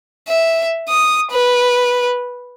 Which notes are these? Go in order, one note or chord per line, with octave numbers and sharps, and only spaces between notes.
E5
D#6
B4